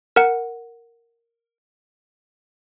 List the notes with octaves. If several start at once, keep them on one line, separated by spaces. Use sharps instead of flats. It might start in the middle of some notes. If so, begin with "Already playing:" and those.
A#4 F#5